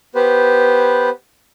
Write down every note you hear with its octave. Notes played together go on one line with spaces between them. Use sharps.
B3 G4 B4 C5